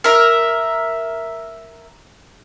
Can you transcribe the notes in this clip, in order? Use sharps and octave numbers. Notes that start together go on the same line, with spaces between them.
A#4 E5